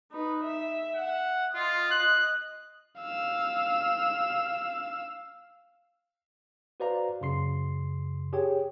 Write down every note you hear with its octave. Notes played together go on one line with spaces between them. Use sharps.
D#4 B4
E5
F#5
F4 D#5
F#6
F5 E6
F#4 B4 C5 D5 F5 A#5
F#2 C#3 C6 C7
G4 G#4 C#5 G5